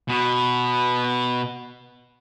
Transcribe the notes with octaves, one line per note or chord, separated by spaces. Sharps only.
B2 B3